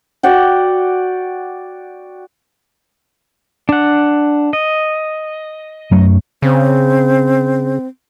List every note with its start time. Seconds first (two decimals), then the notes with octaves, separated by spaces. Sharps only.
0.23 F#4 D5 F#5 G5
3.69 D4 F#5
4.53 D#5
5.91 F#2 F#3 A3
6.42 C#3 C4